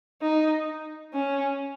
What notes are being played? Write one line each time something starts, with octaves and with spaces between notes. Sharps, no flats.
D#4
C#4